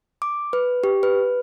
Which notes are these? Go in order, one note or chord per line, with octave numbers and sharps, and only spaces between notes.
D6
B4
G4
B4